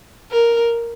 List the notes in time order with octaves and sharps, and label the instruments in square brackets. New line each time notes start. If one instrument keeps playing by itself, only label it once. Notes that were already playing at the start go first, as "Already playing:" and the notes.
[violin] A#4